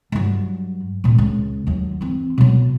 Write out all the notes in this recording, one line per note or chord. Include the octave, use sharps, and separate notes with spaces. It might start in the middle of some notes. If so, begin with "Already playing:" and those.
G2 F#3
D1 A#2
C#2
D#2 F#3
E3 C4
B2 F#3